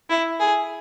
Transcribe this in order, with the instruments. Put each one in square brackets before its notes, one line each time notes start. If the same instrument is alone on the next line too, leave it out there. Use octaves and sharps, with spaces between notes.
[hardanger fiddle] E4
G#4